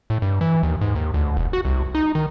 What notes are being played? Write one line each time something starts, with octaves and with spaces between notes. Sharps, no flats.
A2
G2
E3
D#2
G#2
D#2
D2
E1
F#4
C2
D#4
D#3